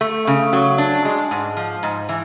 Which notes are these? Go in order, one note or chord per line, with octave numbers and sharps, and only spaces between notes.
A3
C#3
F#3
D4
G#3
G#2
F3
G#2
E3